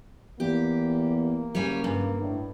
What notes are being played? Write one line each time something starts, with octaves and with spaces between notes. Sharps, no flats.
E2 A#3 G4
F#1 G3 C#5 G#5
G2
A2 D3